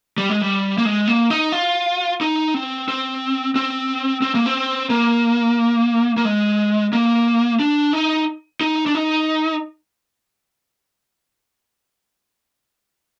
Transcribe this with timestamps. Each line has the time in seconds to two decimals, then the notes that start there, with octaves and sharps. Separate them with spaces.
0.18 G3
0.30 G#3
0.41 G3
0.78 A#3
0.85 G#3
1.07 A#3
1.30 D#4
1.52 F4
2.21 D#4
2.54 C4
2.88 C4
3.56 C4
4.22 C4
4.35 A#3
4.46 C4
4.90 A#3
6.18 A#3
6.25 G#3
6.93 A#3
7.59 D4
7.93 D#4
8.61 D#4
8.86 D4
8.95 D#4